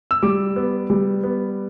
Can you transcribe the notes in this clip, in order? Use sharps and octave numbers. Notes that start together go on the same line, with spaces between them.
E6
G3 D6
B3
G3
B3